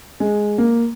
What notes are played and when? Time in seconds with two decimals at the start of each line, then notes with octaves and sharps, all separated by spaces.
0.20 G#3
0.58 A#3